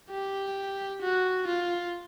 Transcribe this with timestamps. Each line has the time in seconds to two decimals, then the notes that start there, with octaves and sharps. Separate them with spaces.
0.10 G4
1.01 F#4
1.47 F4